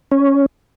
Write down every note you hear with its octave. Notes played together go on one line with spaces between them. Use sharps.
C#4